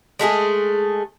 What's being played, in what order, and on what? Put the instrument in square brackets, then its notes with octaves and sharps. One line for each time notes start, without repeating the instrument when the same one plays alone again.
[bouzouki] G#3 A3 G4 G#4